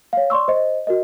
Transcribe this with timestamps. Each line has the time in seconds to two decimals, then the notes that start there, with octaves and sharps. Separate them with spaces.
0.13 C#5 F5
0.30 D5 C6 C#6 E6
0.48 C5 D#5
0.87 F#4 A#4 D#5